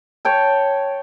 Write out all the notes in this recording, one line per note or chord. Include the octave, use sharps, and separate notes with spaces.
C#5 G5 A5